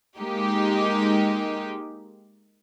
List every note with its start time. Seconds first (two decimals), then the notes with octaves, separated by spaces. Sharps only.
0.18 G#3 A#3 D#4 G4